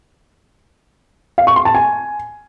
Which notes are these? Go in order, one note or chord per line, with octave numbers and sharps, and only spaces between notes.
F5
C#6
C6
A5
G#5